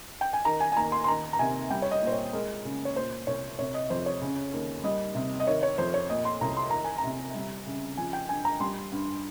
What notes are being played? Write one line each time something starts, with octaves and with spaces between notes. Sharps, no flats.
G5
G#5
D#3 A#5
G#5
G#5
D#2 A#5
C6
C6
D#3 A#5
A#5
C3 G#5
G3 G5
C#5
D#5
A#2
C5
C#5
G#3 A#4
C#3
C#5
A#2 C5
C2 C#5
C3 C#5
D#5
F2 C5
C#5
C#3
D#2
G3 D#5
C3
D#5
D#3 C#5
C#5
F2 C5
C#5
A#2 D#5
C6
C2 A#5
C6
D#3 A#5
G#5
A#5
C3
G3
C#3
F3 G#5
G5
G2 G#5
A#5
G3 C6
G2